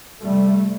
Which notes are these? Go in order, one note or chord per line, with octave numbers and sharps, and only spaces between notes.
F2 C3 G3 A3